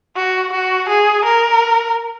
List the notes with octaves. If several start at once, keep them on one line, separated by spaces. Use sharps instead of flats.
F#4
F#4
G#4
A#4